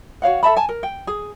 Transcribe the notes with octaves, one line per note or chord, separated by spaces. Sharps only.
F#4 C#5 F5 F#5
A4 E5 A5 B5
G#5 A5
A#4
G5
G#4